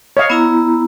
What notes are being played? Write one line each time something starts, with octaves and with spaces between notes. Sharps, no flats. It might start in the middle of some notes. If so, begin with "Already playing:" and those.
C#5 D#5 F5
B3 E4 A#5